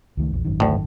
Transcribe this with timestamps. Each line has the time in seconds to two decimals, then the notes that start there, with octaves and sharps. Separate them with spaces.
0.17 C#2 D#3 A3
0.32 A#1 E2
0.45 G#1 F#2 D#3
0.60 D2 A2